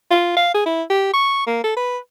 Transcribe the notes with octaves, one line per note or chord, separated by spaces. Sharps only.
F4
F5
G#4
E4
G4
C#6
A#3
A4
B4